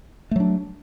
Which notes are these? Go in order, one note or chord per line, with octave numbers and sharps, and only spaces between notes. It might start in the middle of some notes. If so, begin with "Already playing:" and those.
F#3 A3 D4